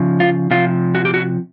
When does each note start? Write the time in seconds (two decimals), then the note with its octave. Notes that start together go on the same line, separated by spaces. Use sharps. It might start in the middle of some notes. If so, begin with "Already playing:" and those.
Already playing: C#3 F3
0.20 F4
0.51 C3 F3 F4
0.95 F#4
1.05 G4
1.14 F#4